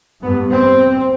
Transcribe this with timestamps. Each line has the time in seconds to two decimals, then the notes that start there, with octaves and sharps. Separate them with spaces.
0.22 G2 B3
0.52 C4